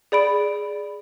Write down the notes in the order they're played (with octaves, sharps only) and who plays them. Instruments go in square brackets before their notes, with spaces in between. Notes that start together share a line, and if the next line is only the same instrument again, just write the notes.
[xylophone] G#4 D5 B5 D7